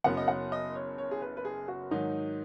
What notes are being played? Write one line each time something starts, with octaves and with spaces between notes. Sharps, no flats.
F#1 F#2 F#3 B3 F#5
D#5
F#5
D#5
C#5
C#5
G#4
B4
B4
G#4
F#4
G#2 D#3 F#3 D#4